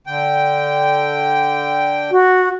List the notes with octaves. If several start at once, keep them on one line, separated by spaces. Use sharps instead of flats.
D3 G5
F#4